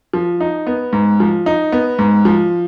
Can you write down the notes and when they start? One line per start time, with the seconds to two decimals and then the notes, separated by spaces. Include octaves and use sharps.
0.14 F3
0.40 D#4
0.67 B3
0.93 G#2
1.20 F3
1.46 D#4
1.72 B3
1.99 G#2
2.25 F3